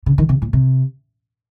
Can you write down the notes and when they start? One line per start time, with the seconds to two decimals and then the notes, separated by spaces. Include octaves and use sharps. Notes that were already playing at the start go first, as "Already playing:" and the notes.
0.06 C#3
0.18 D#3
0.29 C3
0.42 A2
0.53 C3